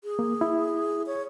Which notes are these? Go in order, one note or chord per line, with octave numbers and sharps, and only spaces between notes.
G#4
A#3
E4
C#5